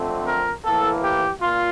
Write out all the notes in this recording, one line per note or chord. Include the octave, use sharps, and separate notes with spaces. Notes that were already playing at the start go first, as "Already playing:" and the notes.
Already playing: F2 D3 A3 C4
A#4
A2 E3 A#3 A4
G4
A#2 F4